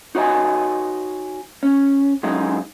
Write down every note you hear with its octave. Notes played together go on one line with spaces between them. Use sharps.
D#4 F#4 C#5 D#5 G#5
C#4
F#3 G#3 C#4 D#4